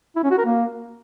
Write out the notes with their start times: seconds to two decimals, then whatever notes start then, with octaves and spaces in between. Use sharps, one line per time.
0.16 E4
0.23 C#4
0.31 F#4
0.38 A#4
0.45 A#3